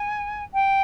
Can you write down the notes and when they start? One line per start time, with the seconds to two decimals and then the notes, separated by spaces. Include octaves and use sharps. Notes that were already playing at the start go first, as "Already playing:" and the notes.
Already playing: G#5
0.53 G5